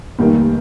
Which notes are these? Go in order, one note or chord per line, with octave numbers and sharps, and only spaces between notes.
F1 D#2 D#3 G3 A#3